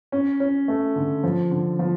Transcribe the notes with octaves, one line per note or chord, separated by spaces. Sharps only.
C#4
C#4
A3
D3
F3
D3
F3